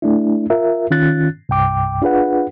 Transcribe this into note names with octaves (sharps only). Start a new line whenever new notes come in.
A3 D4 E4
F4 A#4 E5
D#3 C#4 F4 F#6 A6
C2 G2 G5 D6
D4 F4 G#4 B4 F#5